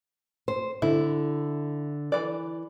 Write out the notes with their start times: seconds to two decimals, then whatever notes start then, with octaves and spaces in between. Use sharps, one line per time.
0.48 C5
0.82 D3 E4
2.12 E3 D5